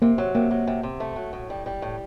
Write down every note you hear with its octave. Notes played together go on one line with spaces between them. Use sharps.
C3 A#3
F#3
C3 A#3
F#3
C3
C3
A3
F#3
A2
G3
G3
A2